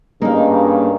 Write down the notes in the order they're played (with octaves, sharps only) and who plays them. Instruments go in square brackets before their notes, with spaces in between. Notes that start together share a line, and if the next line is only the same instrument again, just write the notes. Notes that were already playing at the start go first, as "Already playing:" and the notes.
[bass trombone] G2 [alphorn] C#3 [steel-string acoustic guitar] A#3 [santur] D#4 F5